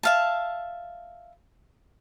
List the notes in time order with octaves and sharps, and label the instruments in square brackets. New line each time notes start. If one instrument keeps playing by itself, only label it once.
[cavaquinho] E5 F5 A5